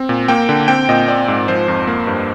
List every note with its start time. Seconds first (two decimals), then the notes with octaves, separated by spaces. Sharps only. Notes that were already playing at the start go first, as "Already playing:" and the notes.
Already playing: C4
0.09 A#2
0.28 A#3 G5
0.49 D3
0.68 C4 G5
0.89 A#2 D#5
1.08 C4 D5
1.28 G#2
1.48 F3 C5
1.68 F2
1.87 A#3
2.07 G2